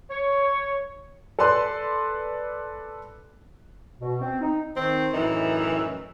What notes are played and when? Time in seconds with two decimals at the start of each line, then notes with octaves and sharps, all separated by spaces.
0.11 C#5
1.39 A4 B4 D5 C6 F#6
4.00 B2
4.21 C4
4.41 D#4
4.77 D#3 C4
5.14 F#2 A2 E3 D#4 E5